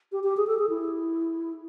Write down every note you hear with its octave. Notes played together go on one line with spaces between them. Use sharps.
G4
G4
G#4
A4
G#4
E4